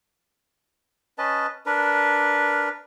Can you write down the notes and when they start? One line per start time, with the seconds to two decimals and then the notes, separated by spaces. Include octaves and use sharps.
1.18 C#4 B4 D#5 A5
1.66 D4 A#4 B4